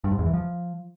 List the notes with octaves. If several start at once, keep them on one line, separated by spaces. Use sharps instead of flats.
G2
G#2
E2
E3
F3